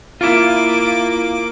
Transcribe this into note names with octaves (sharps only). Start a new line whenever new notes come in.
A#3 E4 F4 D6